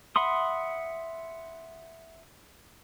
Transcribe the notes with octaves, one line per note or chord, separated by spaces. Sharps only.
E5 F#5 B5 C6 D#6